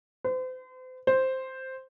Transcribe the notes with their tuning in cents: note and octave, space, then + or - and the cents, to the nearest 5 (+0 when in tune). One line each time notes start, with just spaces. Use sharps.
C5 -40
C5 +0